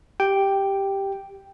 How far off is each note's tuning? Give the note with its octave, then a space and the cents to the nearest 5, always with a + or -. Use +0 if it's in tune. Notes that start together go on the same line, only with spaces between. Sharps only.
G4 +0 G5 +0